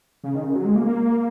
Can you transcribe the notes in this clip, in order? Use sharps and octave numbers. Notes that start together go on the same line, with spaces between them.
C#3
D#3
C#3
F#3
G#3
A#3
A#3